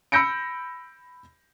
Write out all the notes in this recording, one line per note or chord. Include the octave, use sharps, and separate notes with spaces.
B5 E6 G6 A#6 C#7 D7